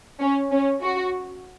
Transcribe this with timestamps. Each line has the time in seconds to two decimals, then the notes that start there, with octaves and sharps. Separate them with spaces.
0.20 C#4
0.51 C#4
0.81 F#4